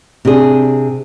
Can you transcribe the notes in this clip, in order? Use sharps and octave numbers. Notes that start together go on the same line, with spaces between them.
C3 D4 G#4